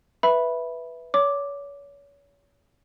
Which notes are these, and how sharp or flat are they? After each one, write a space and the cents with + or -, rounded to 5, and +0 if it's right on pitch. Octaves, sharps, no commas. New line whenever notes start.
B4 +0 E5 +0 B5 -5
C#5 +35 D6 +0